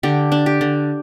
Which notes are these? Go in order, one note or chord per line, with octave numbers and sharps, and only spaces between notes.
D3 G4
D4
G4
D3